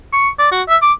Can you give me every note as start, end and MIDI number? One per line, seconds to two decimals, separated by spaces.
0.13 0.29 85
0.39 0.48 74
0.51 0.62 66
0.69 0.77 76
0.82 0.92 86